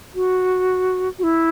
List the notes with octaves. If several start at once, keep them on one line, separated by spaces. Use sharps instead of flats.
F#4
F#4
E4